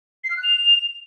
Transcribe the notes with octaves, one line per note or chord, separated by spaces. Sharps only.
C7
F6
F#6
F7